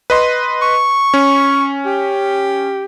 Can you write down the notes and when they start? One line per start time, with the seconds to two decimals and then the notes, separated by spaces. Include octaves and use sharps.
0.10 B4 D#5 C6
0.62 C#6
1.14 C#4
1.85 G4